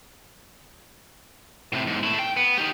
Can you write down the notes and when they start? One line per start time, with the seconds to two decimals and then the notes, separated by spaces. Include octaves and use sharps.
1.72 A2 C3
1.86 E2 G#2
2.03 A3 E4
2.19 G5
2.37 B3
2.58 D#4 G4